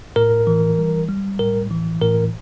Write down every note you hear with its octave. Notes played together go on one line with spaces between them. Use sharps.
A2 A#4
E3
G3
G3
A2 A#4
E3
A2 A#4